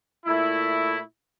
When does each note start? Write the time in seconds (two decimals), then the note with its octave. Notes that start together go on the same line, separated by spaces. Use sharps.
0.25 A#2 A3 E4